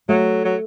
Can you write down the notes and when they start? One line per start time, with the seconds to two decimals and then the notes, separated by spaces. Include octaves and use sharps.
0.09 F#3 A3
0.45 F#3